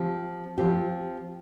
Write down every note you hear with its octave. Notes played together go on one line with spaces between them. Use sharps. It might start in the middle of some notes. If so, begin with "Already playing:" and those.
Already playing: F3 C4 G4
F3 C4 G4